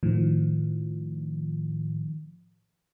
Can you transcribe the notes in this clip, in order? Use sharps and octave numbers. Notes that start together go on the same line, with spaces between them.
A2 D#3 F3